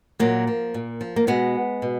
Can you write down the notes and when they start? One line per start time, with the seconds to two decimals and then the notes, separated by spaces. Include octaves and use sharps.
0.19 A#2 F#3 A#3
0.47 F3
0.74 A#2
1.01 F3
1.16 A#3
1.27 B2 G#3 B3
1.82 B2